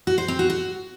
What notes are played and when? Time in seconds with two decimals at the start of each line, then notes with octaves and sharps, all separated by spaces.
0.07 F#4
0.18 C5
0.28 C4
0.39 F#4
0.50 F#4